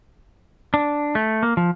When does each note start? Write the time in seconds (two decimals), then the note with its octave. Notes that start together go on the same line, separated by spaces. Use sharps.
0.74 D4
1.15 A3
1.43 A#3
1.57 F3